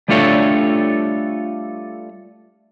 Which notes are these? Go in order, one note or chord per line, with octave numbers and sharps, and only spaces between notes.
G3 A3 D4 F4 A4 C#5